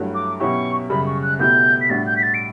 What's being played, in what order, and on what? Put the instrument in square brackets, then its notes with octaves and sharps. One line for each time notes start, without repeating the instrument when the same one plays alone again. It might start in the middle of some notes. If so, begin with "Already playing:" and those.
Already playing: [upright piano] G2 F#3 A3 E4
[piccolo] D6
[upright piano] B2 F#3 C#4 E4 G4 [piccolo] C#6
[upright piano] F#2 C#3 G3 [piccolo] B5
[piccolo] C#6
F#6
[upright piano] B2 A3 E4 G4 [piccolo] G6
[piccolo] B6
[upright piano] A2 G3 D4 F#4 [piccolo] A6
[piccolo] G6
B6
A6
D7